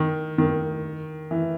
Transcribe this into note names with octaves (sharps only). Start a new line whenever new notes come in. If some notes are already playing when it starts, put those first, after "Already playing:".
Already playing: D#3
D#3
E3